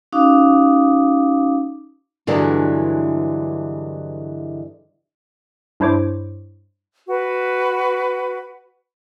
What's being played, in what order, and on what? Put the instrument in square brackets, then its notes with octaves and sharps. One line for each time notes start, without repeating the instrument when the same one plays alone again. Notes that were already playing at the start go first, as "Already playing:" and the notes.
[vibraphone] C#4 D#4 F#4 F5 D6 D#6
[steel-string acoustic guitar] G2 D3 E3 F#3 G#3
[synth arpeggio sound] G2 D4 E4 C5 C#5 D6
[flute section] F#4 B4